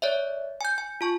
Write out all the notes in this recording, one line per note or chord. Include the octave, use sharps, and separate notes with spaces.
C#5 D5 E5
G#5 G6
G#5
F4 A5 C#6